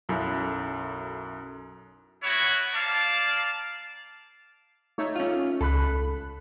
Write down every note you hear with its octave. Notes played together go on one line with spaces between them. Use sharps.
B1 F#2 E4 A4
B3 E4 F#4 C#5
A#3 D5 F5 A5
A3 D#4 C#5
C#4 F4
C#2 A4 B5 F#6